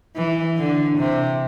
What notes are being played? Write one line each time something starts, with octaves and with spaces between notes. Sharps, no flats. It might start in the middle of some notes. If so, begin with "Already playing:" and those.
E3
D3
C3